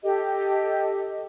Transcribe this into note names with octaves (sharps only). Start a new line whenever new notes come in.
G4 A4 D#5